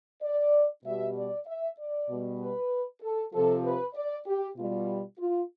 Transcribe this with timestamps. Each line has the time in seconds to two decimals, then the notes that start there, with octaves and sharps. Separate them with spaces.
0.23 D5
0.85 B2 G3 E5
1.16 D5
1.47 E5
1.78 D5
2.09 B2 G3
2.40 B4
3.02 A4
3.33 C3 F3 A4
3.64 B4
3.95 D5
4.26 G4
4.57 B2 G3 F4
5.19 F4